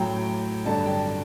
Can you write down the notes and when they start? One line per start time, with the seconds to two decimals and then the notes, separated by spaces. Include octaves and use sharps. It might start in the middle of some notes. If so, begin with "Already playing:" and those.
Already playing: A2 F#3 G5
0.65 G2 D3 F#3 A5
0.86 G5
0.91 A5